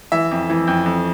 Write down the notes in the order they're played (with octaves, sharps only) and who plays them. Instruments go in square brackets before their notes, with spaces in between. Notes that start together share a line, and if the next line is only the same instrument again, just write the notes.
[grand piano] E3 E5
F2
E3
F2
F2